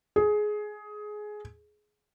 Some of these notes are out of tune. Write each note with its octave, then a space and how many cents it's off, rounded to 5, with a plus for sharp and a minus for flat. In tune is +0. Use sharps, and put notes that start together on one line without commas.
G#4 +15